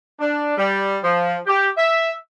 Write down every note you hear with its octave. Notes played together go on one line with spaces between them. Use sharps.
D4
G3
F3
G4
E5